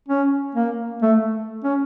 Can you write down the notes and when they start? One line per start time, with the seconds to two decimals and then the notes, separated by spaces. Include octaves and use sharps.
0.08 C#4
0.55 A#3
1.02 A3
1.64 C#4